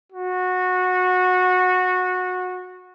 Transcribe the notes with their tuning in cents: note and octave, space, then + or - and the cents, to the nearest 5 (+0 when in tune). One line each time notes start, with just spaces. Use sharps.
F#4 -20